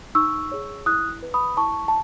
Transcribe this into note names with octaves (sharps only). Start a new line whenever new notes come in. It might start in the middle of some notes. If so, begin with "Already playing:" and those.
D#4 C#6 E6
G#4 C#5
E4 D#6 F#6
B4
B5 D#6
E4 A5 C#6
A5